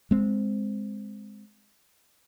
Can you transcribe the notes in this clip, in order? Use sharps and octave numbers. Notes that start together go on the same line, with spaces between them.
G#3 C4